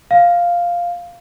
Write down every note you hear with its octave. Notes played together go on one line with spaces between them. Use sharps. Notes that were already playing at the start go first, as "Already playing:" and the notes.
F5